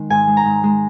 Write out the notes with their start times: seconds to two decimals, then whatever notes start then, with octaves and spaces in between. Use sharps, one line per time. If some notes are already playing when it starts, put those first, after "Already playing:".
Already playing: D#3 G#3
0.10 G#2 G#5
0.27 G#3
0.37 A#5
0.45 G#2
0.63 G#3